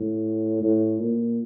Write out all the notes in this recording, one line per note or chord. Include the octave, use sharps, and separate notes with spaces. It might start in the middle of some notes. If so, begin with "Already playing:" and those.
Already playing: A2
A2
A#2